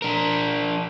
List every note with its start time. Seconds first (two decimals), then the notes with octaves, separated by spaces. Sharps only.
0.02 D4 A#4